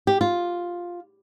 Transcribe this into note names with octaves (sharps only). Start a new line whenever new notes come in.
G4
F4